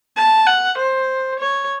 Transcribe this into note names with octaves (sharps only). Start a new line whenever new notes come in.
A5
F#5
C5
C#5